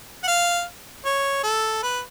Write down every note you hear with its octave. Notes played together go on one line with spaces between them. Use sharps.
F#5
F5
C#5
A4
B4